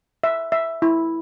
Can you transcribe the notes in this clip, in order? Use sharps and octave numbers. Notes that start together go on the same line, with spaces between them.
E5
E5
E4